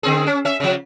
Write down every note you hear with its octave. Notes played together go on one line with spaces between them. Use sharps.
D3 C4 G#4
C#4
C#4 E5
C#3 F3